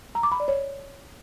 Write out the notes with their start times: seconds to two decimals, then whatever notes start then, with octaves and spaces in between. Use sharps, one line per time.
0.15 A#5
0.23 D6
0.32 B5
0.40 D5
0.48 C#5